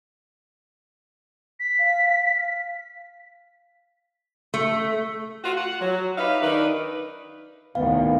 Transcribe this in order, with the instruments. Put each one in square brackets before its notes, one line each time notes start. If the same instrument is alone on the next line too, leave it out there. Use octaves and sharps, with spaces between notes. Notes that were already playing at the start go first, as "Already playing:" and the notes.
[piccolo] B6
[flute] F5
[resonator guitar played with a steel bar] A3
[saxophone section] F4 F#4
F#5
F#3
D#4 G4 B4 E5 F5
D#3 D4 D#4 B4
[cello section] D2 A2 C3 [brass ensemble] D#3 B3 [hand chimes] F5